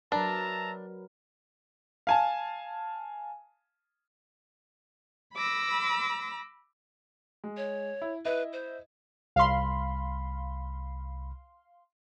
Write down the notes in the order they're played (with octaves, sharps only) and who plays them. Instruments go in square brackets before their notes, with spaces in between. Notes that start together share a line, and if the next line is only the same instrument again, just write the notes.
[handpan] F#3 A#4 B4 [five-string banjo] D4 [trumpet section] E5 A5 A#5
[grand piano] F5 G#5 A5
[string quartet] B5 D6 E6 A#6
[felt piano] G#3
[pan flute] C#5
[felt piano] E4
[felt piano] E4 D#5 E5 [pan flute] B4
[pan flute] C5
[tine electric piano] C2 B5 [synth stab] F5 C6